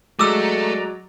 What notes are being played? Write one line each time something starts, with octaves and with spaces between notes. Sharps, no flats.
F#3 G#3 A3 F#4 D5 A#5 D6 E6